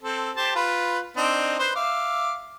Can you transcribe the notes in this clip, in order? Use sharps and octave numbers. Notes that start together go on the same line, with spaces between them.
C4 A4
G4 C5 A5
F4 B4
C4 D4 D#4
B4 C5
E5 F5 D6